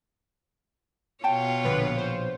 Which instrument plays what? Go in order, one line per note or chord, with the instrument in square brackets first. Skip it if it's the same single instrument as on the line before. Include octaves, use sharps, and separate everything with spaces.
[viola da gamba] B2 F4 C#5 [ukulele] F#5 G5 A5
[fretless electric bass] A#1 [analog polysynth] D3 B3 B4
[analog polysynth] C5